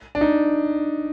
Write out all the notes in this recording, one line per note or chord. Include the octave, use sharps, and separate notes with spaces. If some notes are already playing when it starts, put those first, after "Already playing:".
D4
D#4